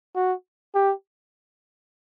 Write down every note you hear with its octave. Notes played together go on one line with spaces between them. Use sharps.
F#4
G4